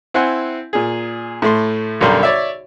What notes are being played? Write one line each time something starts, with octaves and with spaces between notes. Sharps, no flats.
C4 E4 F#5 G#5 C6
A#2 G#4
A2 A3 C6
B1 F#2 D3 G3 A#4 C6
C#5 D5 E5